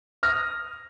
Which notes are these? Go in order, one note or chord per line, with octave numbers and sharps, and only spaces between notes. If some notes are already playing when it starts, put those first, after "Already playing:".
D#6 F6 A#6